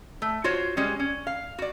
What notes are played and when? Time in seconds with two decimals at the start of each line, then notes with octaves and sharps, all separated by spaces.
0.22 A3
0.44 F4 F#4 C5 C#5
0.77 G3 G#3 C#4
1.00 C#4
1.27 F5
1.59 F#4 D5